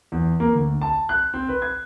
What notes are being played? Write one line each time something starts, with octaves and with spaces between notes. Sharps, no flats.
E2
A#3
D2
A5
F#6
C4
B4
G#6